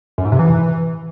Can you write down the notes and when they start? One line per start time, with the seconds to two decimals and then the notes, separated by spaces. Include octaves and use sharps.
0.18 F#2
0.25 G#2
0.32 C3
0.39 E3